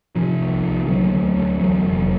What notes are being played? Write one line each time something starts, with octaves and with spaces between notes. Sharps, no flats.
C3 F3
C2
C2
D3 F#3
D2
D2
E2 F#3
F1